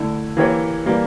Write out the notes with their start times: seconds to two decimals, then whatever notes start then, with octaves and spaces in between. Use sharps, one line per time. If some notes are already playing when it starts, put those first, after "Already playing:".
Already playing: D3 A3 E4 A4
0.37 E3 A#3 E4 G4 C#5
0.86 E3 G3 A#3